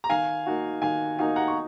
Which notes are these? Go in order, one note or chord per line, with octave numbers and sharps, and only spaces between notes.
A#5
D#3 F5 G#5
A#3 D#4 F#4
D#3 F5 G#5
A#3 D#4 F#4 F5 G#5
F#5 A#5
C#6